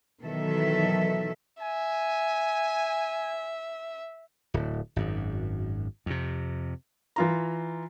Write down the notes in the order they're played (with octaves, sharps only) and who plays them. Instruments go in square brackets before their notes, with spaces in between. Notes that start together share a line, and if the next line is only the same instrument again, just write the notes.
[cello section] B2 D#3 E3 F#3 A4 E5
[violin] E5 [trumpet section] G#5
[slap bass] D1
G#1 F#2
F2 C3
[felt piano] E3 F4 A#5